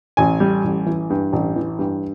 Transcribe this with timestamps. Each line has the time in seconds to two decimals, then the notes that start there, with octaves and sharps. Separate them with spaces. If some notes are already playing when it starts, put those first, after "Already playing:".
0.17 A1 G#5
0.40 G3
0.64 A1
0.86 E3
1.10 G2
1.33 A1
1.56 E3
1.79 G2